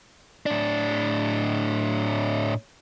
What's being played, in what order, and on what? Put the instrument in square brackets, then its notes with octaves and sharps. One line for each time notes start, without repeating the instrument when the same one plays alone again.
[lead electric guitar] A2 D4